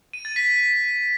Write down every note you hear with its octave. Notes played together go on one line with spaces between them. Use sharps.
D#7
A6
B6